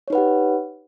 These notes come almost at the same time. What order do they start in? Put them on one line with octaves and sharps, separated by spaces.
C#5 D#4 B4 F#5 G4